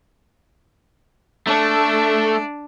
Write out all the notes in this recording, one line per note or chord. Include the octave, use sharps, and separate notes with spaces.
A3 D4